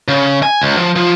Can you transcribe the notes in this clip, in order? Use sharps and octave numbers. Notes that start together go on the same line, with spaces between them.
C#3
G#5
C#2
F3
F3